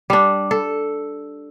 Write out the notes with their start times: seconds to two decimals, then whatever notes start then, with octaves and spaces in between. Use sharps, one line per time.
0.10 G3 D4
0.51 A4